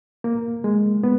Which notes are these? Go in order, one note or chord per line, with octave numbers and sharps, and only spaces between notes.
A#3
G#3
B3